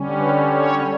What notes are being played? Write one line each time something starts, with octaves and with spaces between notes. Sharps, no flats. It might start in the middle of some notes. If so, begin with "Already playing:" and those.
Already playing: D3 G3 C#4
B4
C#5